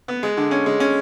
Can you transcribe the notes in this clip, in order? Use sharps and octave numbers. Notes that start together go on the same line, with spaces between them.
B3
G#3
D3
C#4
G#3
C#4